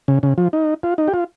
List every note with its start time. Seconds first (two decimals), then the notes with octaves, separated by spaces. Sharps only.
0.08 C#3
0.23 C#3
0.38 F3
0.53 D#4
0.83 F4
0.98 D#4
1.08 G4
1.14 F4